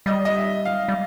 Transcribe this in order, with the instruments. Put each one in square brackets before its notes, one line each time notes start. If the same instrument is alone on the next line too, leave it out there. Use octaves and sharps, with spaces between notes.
[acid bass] G3 [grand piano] D#5
[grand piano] D#5
E5
F5
[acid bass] G3